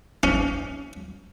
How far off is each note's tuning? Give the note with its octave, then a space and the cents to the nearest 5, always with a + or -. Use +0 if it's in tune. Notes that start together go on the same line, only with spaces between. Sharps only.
C#4 +25